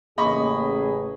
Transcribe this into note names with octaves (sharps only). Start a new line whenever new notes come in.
A1 C#3 A#3 G#4 D#5 B5 C#6